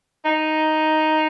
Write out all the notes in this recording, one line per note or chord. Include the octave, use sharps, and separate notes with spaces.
D#4